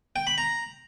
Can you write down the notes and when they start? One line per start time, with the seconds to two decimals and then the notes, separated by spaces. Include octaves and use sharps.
0.16 G5
0.27 B5
0.38 A#5